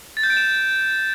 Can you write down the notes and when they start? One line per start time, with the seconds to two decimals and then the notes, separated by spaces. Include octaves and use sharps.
0.17 A6
0.23 G6
0.30 D7
0.37 E7